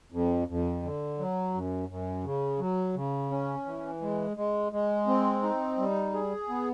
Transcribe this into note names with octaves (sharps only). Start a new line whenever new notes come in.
F2
F2
D3
F#3
F#2
F#2
C#3
F#3
C#3
C#4
E3
G#3
G#3
G#3
C4
D#4
G3
G#4
B3